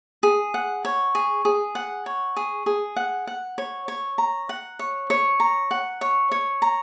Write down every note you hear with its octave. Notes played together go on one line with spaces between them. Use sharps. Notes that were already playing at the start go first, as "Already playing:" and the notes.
G#4
F#5
C#5
G#4
G#4
F#5
C#5
G#4
G#4
F#5
F#5
C#5
C#5
A#5
F#5
C#5
C#5
A#5
F#5
C#5
C#5
A#5